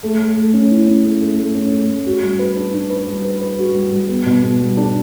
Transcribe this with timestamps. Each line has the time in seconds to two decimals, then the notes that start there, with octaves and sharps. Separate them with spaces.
0.03 A3
0.19 A3
0.37 A3
0.54 C#4
0.71 E4
0.87 C#4
1.05 A3
1.21 A3
1.38 A3
1.55 C#4
1.72 A3
1.89 A3
2.06 F#4
2.22 G3
2.39 B4
2.56 D4
2.74 D4
2.90 B4
3.08 G3
3.24 B4
3.41 B4
3.59 F#4
3.75 G3
3.92 G3
4.09 B3
4.26 B2
4.43 B3
4.60 G3
4.77 D4